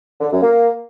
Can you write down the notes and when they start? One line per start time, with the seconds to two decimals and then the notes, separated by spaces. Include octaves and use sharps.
0.21 D3
0.31 F#2
0.42 A#3